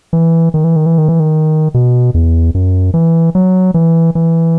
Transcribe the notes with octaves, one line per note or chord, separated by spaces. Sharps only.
E3
D#3
E3
D#3
E3
D#3
E3
D#3
B2
E2
F#2
E3
F#3
E3
E3